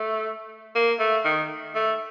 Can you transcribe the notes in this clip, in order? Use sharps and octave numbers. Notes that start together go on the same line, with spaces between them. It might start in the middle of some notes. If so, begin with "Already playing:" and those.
Already playing: A3
A#3
A3
D#3
A3